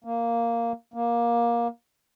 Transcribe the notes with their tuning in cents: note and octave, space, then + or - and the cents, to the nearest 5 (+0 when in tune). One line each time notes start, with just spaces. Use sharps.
A#3 -5
A#3 +15